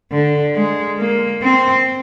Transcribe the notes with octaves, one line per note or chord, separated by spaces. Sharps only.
D3
G#3
A#3
C4